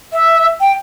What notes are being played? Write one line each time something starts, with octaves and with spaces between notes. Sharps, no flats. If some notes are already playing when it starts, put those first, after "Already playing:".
E5
G5